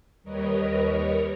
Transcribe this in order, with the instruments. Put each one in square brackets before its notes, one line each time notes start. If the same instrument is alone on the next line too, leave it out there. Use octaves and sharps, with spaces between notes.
[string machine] D#2 G3 A#4 B4 C#5 D#5